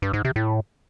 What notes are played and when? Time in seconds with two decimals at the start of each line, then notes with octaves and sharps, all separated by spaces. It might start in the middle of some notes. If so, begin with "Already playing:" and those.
0.02 G2
0.13 G#2
0.25 C3
0.36 A2